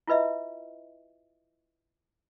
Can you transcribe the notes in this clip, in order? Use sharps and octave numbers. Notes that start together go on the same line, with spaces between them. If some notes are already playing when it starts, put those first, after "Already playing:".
E4 F4 B4 D#5 E5